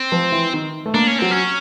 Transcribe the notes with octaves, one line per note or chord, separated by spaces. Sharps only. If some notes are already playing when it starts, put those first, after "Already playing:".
Already playing: C4
F3
E3
D#3
A3
A#3 D4
C#4
F#3 C4
C#4